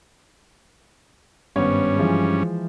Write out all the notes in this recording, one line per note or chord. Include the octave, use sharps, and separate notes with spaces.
G#1 G2 B3 C#4 C#5
E3 F3 G#3